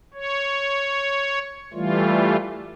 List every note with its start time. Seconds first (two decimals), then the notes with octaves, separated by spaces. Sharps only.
0.14 C#5
1.74 E3 G3 A3 F4